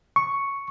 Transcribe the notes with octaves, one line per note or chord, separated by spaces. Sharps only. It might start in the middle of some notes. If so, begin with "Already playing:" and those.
C#6